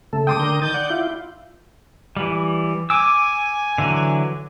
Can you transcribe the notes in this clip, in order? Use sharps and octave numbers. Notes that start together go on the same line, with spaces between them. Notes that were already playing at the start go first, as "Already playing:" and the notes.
C#3 A3 A4
G5 C6 D6 D#6
D3 A#4 G6
D#3 D#6 G6 A6
D5 F#5
E4 F4
E3 G3
G#5 D6 E6
D3 E3 F#3